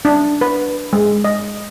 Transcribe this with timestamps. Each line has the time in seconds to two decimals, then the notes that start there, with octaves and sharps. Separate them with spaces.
0.05 D4
0.41 B4
0.93 G#3
1.24 D#5